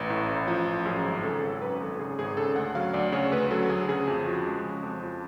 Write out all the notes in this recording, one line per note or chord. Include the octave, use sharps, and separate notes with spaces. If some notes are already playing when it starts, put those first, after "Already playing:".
Already playing: A1 B4
A2
A1
F3
A1
F#2 G#4
G#1
C#3 A4
G#1
F#2 B4
G#1 A4
C#3 G#4
G#1 G#4
C#3 A4
D2 F#5
F#3 F5
D2 D5
C#3 C#5
D2 B4
F#3 A4
D2 G#4
C#3 G#4
F2
F3 F#4
G#3
C#3
F2
F3